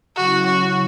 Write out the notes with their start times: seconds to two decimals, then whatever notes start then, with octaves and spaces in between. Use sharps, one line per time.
0.16 C#3 F#3 C#4 E4 F#4
0.47 F#4